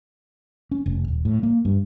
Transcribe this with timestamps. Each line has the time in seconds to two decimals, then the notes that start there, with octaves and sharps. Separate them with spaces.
0.71 C#4
0.86 F1
1.08 D#1
1.25 A2
1.43 A#3
1.65 G2